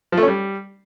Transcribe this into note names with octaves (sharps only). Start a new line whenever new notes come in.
F3
A3
C#4
G3